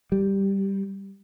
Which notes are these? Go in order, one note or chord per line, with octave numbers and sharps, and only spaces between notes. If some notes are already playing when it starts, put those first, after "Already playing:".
G3